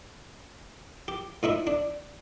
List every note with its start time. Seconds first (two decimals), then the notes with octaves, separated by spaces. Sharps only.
1.08 G4
1.43 A2 D#4 E4 E5
1.67 D4